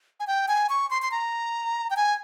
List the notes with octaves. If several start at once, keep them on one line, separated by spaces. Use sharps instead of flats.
G#5
G5
G#5
C#6
C6
C6
A#5
G5
G#5